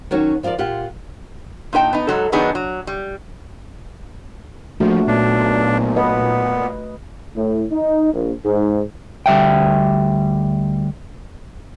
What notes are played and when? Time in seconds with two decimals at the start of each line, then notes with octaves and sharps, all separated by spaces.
0.11 D#3 F#3 C#4 F#4
0.43 F3 F4 G#4 A#4 D5
0.58 A#2 F4 G4 F#5
1.73 A#2 D#4 B4 G5 A5
1.93 B3 D#4
2.07 G#2 F#3 A4
2.32 D#3 F#3 B3 D4 D#4 G#4
2.55 F#3
2.87 G3
4.80 A#1 F3 A3 F#4
5.07 B1 A#2 D4
5.96 B3 B4 D#5
7.36 A2
7.72 D#4
8.13 A#1
8.44 G#2
9.26 D2 G3 E5 G5